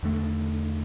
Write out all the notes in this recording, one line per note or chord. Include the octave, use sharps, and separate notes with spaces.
E2 D3 A3